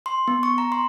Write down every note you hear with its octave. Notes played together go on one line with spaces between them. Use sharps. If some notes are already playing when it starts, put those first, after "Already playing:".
C6
B3
C#6
A#5
C6